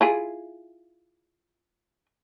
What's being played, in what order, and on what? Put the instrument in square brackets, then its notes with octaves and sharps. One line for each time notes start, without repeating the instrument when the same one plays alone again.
[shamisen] E4 F4 G#4